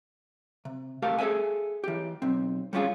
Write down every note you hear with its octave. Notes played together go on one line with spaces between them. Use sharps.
C3
A3 G4 A4 A#4 F5
G#4 A4 D5 E5 G#5
E3 G4
B1 C4
G3 G#3 C#4 F4 G#4